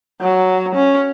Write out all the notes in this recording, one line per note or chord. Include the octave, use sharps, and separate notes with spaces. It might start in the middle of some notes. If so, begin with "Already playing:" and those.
F#3
C#4